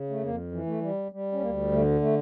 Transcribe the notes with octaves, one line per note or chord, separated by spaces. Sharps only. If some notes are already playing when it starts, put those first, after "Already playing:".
Already playing: C#3
A3
F2 A#3
E3
A3
G3
G3
C#4
D2 A#3
D3 A3
A3